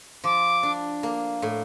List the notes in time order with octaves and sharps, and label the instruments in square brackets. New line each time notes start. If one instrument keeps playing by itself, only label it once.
[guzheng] F3 [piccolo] D6
[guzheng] D4
A#3
A2